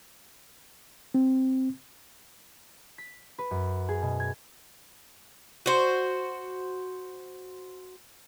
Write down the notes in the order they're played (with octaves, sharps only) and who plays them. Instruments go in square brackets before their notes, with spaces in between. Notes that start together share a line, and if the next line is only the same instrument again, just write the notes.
[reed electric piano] C4
[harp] B6
B4
F#2
G#4
B2
G#6
[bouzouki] F#4 C5